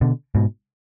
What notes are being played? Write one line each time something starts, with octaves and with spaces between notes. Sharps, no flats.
B2 D3
G#2 B2